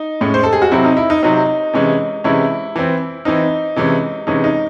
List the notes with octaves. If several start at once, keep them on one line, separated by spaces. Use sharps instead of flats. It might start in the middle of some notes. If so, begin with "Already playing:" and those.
Already playing: D#4
A2 G#3 C#4
C5
A4
G#4
F#4
C3 F#3 C4 E4
D#4
E4
D#4
C3 F#3 C4 D#4
C3 E3 G#3 C#4
C3 E3 G#3 C#4 E4
E3 C4
E3 C4 D#4
C3 E3 G#3 C#4
C3 E3 G#3 C#4 D#4
D#4